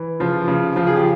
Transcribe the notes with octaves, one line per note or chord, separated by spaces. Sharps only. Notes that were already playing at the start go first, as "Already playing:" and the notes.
Already playing: E3
C#3 F3 F4
C#3
C#3 F3 F4
G#4
G4